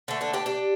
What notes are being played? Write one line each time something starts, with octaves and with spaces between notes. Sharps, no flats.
D3 A3
A3 D4
D4 G4
D4 G4